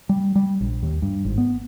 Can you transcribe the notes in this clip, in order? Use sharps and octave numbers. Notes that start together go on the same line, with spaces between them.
G3
G3
A#1
D#2
G2
G#1
B3